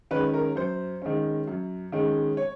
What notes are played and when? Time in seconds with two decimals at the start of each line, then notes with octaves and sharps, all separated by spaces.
0.11 D#3 G#3 C#4 B4
0.34 A#4
0.56 F#2 C5
1.02 D#3 G#3 C#4
1.47 F#2
1.92 D#3 G#3 C#4
2.37 C#5